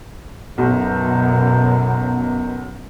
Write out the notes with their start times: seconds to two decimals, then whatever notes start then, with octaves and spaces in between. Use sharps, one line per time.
0.58 B1 F#2 B2